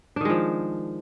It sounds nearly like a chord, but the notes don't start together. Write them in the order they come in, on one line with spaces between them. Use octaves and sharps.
D4 D#3 G#3 F3